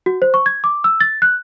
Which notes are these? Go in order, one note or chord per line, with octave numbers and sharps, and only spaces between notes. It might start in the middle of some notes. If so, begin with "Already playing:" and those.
F#4
C5
C#6
G#6
D6
E6
A6
F#6